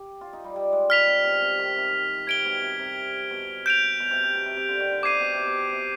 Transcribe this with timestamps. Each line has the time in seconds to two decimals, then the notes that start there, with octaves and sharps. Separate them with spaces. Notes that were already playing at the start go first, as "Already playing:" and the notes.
Already playing: G4
0.21 F4
0.33 D#4
0.44 G3
0.56 G3
0.73 G#3
0.90 G3 F6 B6 F7
1.07 C3
1.24 B2
1.42 C3
1.59 D#3
1.76 C3
2.27 C3 G#6 D7 G7
2.46 B2
2.62 C3
2.79 C3
3.31 B2
3.66 G6 D7 F7
4.00 B2
4.11 C3
4.23 C3
4.35 B2
4.46 C3
4.57 C3
4.69 D3
4.80 D#3
4.91 D3
5.03 C3 D6 G#6 C7 D#7
5.20 B2
5.34 C3
5.46 B2
5.72 C3